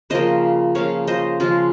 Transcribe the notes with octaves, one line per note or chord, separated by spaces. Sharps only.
C#3 F3 A#3 C5 D#5
C#3 F3 A#3 C#5 F5
C5 D#5
C#3 F3 G#3 F4 G#4